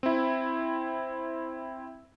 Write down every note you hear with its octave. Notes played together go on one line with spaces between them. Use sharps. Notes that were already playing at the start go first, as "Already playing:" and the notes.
C4 E4